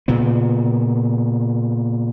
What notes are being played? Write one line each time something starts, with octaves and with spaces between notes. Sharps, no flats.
A#2 C#3 B3